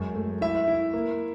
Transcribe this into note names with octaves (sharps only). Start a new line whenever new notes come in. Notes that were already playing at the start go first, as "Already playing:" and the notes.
Already playing: F#2 G#3
A3
E4 E5
E4
A#3